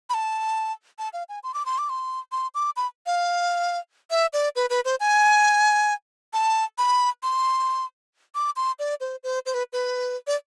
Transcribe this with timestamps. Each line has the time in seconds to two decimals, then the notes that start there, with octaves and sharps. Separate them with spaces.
0.10 B5
0.14 A5
0.99 A5
1.13 F5
1.29 G#5
1.44 C6
1.54 D6
1.66 C6
1.78 D6
1.89 C6
2.32 C6
2.55 D6
2.76 B5
3.06 F5
4.11 E5
4.33 D5
4.56 B4
4.70 B4
4.85 C5
5.00 G#5
6.33 A5
6.78 B5
7.23 C6
8.35 D6
8.56 C6
8.79 D5
9.00 C5
9.24 C5
9.46 C5
9.54 B4
9.73 B4
10.27 D5